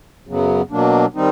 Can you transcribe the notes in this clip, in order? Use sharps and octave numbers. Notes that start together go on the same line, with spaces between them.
F#2 C#3 F#3 B3
B2 F#3 A#3 D4
D#3 G3 C4 D#4